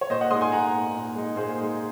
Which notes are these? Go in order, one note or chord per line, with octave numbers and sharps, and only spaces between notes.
C#5
A#2 C5 D#5
D#5 F#5
G#3 D#4 C6 D#6
G#5 C6
A#2 F#5 A#5
G#3 D#4
A#2
G#3 D#4
A#2 G#4 C5
G#3 D#4